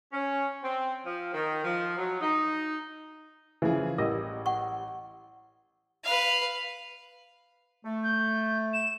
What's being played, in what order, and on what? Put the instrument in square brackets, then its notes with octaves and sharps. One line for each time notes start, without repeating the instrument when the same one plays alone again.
[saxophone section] C#4
C4
F3
D#3
F3
F#3
D#4
[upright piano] C#3 F3 G#4 [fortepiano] E3
[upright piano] A1 G3 [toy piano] A#4 [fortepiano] D#5
[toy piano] F#5 C#6
[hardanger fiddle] B4 F5
[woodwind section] A3
[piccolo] G6
E7